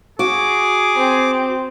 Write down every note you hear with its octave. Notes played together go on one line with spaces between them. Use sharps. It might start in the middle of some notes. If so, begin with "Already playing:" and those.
F#4 G#4 D6
C4